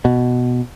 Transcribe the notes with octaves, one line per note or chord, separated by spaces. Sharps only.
B2